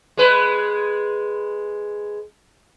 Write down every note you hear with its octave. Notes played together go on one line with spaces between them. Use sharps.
G#3 B4